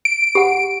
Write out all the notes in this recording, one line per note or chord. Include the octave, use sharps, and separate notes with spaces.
D7
G4 F#5